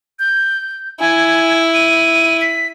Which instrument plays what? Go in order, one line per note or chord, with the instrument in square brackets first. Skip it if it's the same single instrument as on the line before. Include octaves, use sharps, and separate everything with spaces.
[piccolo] G6
[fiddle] E4 [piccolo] G#5
[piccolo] D#7
B6